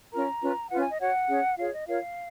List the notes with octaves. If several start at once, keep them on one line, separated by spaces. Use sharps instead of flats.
C#4 F4 A#4 A#5
C#4 F4 B4
C#4 F4 B4 F#5
G#5
D#5
F#4 C#5 F#5
C#4 G#4 C#5
F4 G#4 C#5 F5
D#5
F4 A#4 C#5 F5